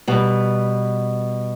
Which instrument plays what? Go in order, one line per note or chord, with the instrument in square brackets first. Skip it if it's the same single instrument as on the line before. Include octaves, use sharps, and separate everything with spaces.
[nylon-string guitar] B2 G3 B3